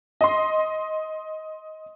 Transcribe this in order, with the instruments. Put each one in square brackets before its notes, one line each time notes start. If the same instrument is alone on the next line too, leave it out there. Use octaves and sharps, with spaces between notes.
[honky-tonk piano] D#5 C6